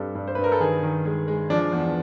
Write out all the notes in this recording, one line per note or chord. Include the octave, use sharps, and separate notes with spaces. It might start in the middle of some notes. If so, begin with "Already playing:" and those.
Already playing: G2 G3 C4 A4
G2
C5
B4
G2
A#4
A4
D#3 G#4
D#3
G#3
G#3
F3 D4
E2